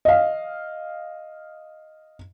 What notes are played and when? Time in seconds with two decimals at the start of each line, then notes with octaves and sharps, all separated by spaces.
0.05 D#5 F5